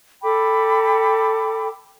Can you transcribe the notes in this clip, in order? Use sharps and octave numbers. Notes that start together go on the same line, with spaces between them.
A4 G5 B5 D6